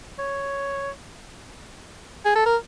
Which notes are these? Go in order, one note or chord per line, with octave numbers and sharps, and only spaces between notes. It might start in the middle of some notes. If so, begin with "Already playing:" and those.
C#5
G#4
A4
A#4